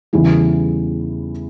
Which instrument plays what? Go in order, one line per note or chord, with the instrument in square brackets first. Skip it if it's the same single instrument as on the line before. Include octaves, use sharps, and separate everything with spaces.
[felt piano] E2 C#3 E3 G3